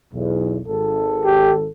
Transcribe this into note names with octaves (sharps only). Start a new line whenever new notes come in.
B1 E2
G#1 A4
G4